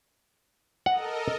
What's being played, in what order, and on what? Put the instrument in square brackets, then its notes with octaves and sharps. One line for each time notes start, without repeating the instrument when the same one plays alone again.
[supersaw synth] A4 A#4 D#5 [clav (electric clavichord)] F#5